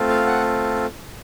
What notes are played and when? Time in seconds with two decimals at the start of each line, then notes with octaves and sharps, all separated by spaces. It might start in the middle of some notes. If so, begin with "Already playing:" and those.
Already playing: A3 C4 F4 A4
0.09 F5
0.27 F#5